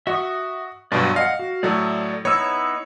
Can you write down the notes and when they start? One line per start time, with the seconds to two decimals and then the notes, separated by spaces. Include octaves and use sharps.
0.07 F#4 E5 C#6 D#6
0.92 G2 B2 F#3 D5 G#5 C6
1.16 D#5 F5 F#5
1.39 F#4
1.63 A2 F#3 A3 D5 E5
2.25 B3 D#4 E4 C#5 E6